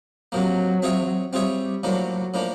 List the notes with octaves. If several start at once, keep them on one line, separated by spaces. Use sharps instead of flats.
C3 F3 F#3 A#3
C4 F4 G#4 C#5 E5
G3 C4 F4 G#4 C#5 E5
A2 F3 F#3 A#3 D4
A2 F3 A#3 D4